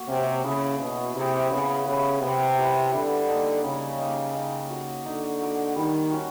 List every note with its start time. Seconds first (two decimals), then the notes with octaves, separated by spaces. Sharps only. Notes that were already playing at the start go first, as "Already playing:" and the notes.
Already playing: A#3 F#4
0.08 C3 C#4
0.44 C#3 E4 G#4
0.79 B2 C#4
1.15 C3 E4 G#4
1.50 C#3 B3
1.86 C#3 E4 G4 B4
2.21 C3 B3
2.57 E4 G4 B4
2.92 D3 G3
3.28 A#3 D#4
3.63 C#3 G3
3.99 A#3 D#4
4.34 D#4
4.70 F#4 A#4
5.05 D3 D#4
5.41 F#4 A#4
5.76 D#3 G3
6.12 C#4 F#4